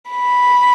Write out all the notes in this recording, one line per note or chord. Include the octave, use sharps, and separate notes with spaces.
B5